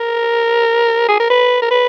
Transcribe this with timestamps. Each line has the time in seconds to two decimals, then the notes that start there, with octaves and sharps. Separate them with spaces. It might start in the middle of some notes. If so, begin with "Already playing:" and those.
Already playing: A#4
1.08 G#4
1.20 A#4
1.30 B4
1.62 A#4
1.71 B4